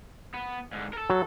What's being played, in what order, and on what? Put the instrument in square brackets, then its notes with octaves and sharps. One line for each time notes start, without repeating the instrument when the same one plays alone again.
[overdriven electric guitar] B3
G#2 D3
A4 A#4
[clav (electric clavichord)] F#3